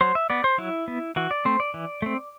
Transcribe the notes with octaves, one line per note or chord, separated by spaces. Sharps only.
F#3 C5
E5
B3 D5
C5
F#3 E4
B3
E3 F#4
D5
A3 C4 C5
D5
E3
A3 C4